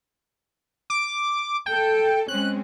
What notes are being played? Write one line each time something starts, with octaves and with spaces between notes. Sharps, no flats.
D6
A4 G5
G#3 C4 C#4 F#6